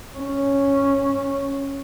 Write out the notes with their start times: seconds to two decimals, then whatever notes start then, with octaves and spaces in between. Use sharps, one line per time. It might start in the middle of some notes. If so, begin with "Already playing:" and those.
0.16 C#4